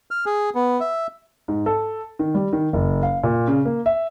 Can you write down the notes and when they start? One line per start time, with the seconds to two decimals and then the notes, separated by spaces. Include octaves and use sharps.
0.11 F6
0.26 G#4
0.55 B3
0.80 E5
1.48 G#2
1.66 A4
2.19 D#3
2.35 G3
2.53 D#3
2.73 F#1
3.03 F5
3.23 A#2
3.48 C#3
3.65 A#3
3.86 E5